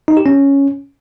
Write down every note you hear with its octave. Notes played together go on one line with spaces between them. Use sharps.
D#4
G4
C#4